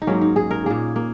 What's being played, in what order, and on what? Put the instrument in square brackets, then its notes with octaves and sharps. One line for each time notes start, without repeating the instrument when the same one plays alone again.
[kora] D#4
G#2 F#3 A#3 C#4
D#4
G#4
A#4
A#2 A#3 G#4
A#3